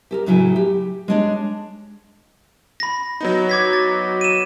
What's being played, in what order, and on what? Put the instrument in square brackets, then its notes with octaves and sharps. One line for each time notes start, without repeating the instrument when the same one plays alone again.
[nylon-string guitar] G4 A4 A#4
A2 C#3 F#3 E4 F5 G#5
G4
G#3 D4 C#5
[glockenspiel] B5 A#6
[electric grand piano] F#3 B3 D#4
[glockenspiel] D6 G#6 B6
A6
D#7 E7